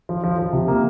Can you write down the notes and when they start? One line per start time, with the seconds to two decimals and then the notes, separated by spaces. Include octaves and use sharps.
0.09 F3
0.24 F3
0.38 F3
0.53 C3
0.68 A#3